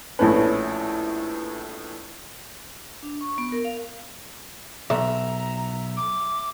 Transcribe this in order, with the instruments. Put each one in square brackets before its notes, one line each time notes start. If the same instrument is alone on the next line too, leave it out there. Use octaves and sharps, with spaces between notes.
[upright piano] A#1 A2 A3 B3 C#4 B4
[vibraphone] D4
C#6
B3
A#4
F5
[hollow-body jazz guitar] B1 [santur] E5 [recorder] A#5
[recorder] D6